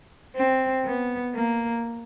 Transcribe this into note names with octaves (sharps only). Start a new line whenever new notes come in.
C4
B3
A#3